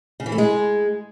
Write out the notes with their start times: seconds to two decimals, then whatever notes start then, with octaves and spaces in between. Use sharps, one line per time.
0.20 C#3
0.26 E3
0.32 A3
0.38 G#3